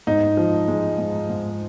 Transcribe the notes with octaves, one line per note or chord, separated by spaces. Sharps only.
G#2 D#4
F3
G#3
G#2
G#2